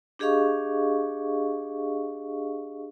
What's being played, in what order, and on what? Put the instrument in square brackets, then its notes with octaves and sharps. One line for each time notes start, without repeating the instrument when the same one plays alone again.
[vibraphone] D4 G4 G#4 D#5 F5 C#6